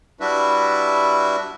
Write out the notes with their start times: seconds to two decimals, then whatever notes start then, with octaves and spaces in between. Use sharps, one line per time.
0.20 G3 D4 E4 F#4 B4 E5